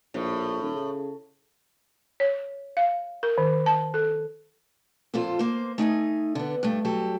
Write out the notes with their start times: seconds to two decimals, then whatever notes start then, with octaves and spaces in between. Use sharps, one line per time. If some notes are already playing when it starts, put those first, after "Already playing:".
0.14 A#1 A2
0.61 D#1
0.74 C#3
2.20 C#5
2.77 F5
3.23 A#4
3.38 D#3
3.66 A5
3.94 A4
5.14 F2 A#2 F4 A4 C5
5.39 A#3 C5
5.78 A3 D#4 G5 G#5
6.35 D3 B3
6.63 G2 A3
6.85 F#3 G4 A4